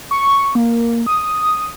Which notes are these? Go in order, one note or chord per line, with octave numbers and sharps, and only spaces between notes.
C#6
A#3
D#6